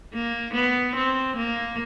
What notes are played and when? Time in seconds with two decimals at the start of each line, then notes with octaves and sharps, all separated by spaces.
0.14 A#3
0.54 B3
0.96 C4
1.37 A#3